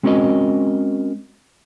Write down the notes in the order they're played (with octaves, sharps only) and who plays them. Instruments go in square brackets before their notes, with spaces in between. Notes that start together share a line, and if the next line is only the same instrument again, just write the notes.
[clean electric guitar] G#3 C4 C#4 F#4 A#4 D#5